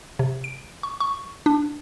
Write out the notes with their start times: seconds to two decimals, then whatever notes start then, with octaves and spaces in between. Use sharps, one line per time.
0.19 C3
0.44 D7
0.83 C#6
1.00 C#6
1.46 D4